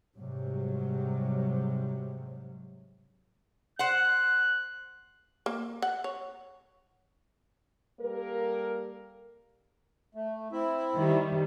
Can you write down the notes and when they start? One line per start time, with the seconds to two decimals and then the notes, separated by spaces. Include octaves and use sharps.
0.17 G#2 C3 F#3 G3
3.79 C5 F#5 F#6
5.46 A#3
5.82 F#5
6.04 C#5
8.00 G3 A#3 A4 A#4
10.15 A3
10.52 C4 E4 E5
10.95 D#3 G3